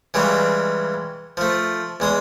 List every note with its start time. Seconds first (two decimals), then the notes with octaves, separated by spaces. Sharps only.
0.14 C#3 E3 G3 G#3
1.37 F3 A3
2.00 E2 G#3 D#6